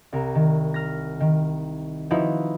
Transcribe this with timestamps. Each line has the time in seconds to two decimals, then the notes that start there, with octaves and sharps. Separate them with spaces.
0.13 C2 A#4
0.35 D#3
0.74 F6 A#6
1.20 D#3
2.11 F3 D#4 E4 F#4 B4 E5